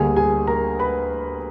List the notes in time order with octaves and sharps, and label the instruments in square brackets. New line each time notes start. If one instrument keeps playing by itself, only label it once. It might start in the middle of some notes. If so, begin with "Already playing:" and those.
Already playing: [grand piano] D2 D3 G3 A#3 G#4 G#5
G#4 G#5
A#4 A#5
B4 B5